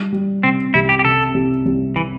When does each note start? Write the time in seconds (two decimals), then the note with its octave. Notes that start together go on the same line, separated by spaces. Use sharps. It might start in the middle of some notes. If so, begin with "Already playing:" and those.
Already playing: G3
0.12 G3
0.43 C3 C4
0.74 C2 E4
0.89 G4
0.99 G4
1.05 C3 A4
1.34 C2
1.66 C2
1.96 E3